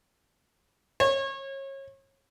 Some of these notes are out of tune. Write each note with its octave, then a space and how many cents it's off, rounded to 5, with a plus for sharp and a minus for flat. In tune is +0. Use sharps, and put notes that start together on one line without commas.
C#5 -30